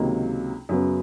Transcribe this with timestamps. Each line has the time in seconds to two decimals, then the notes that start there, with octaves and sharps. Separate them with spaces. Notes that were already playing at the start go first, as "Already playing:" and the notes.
Already playing: C#2 C3 D#3 F#3 A#3
0.69 F#2 C#3 F#3 B3